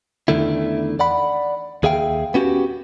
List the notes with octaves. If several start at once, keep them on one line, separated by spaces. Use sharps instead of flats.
E2 A2 D3 D#3 A3 E4
D5 F#5 B5
D#2 G#4 E5 F5 G5
B3 C#4 F#4 G4